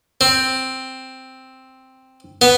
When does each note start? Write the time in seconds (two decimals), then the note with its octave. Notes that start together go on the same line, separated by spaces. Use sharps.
0.21 C4
2.42 B3